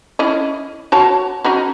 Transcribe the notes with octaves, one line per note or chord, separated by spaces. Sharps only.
C#4 E4 D#5
F#4 C#5 A5
C#4 D#4 F#4